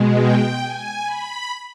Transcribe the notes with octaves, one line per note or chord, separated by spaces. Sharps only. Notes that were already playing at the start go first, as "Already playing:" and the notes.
Already playing: B2 G#3
G5
G#5
B5